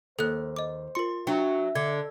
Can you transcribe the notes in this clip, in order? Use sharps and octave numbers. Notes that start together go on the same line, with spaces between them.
D#2 A4 C5 F#6
D#5 D6
F4 A#4 C6 C#7
F#3 D4 E5 G5
D3 G#6